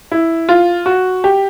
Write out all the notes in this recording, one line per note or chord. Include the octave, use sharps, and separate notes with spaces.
E4
F4
F#4
G4